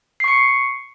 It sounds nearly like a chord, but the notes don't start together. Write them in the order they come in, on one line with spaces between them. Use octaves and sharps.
C7 C#6 C#7